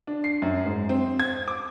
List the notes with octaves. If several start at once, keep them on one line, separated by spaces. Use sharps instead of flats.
D4
C7
F#2
G#2
C4
G#6
D6